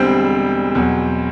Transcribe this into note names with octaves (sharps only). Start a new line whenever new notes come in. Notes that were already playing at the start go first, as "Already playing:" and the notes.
Already playing: E1 E2 D3 G3 C4 C5
E2 B2 F#3